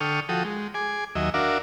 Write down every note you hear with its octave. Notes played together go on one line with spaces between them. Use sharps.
D3 A4 G5 C#6 D#6 F6
F3 F#4 A4 G5 D#6
G#3
G#4 G#5 D6
D#2 F#3 D#5 E5
D4 F#4 A#4 E5 F5 D6